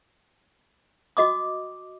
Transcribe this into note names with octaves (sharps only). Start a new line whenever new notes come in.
F#4 D#5 D6 D#6